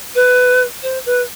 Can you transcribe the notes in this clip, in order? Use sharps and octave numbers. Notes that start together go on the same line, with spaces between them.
B4
C5
B4